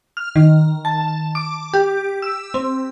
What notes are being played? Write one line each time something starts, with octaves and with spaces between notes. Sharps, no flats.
F6
D#3
A5
D6
G4
E6
C4